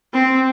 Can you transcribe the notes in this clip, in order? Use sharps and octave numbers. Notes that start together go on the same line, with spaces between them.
C4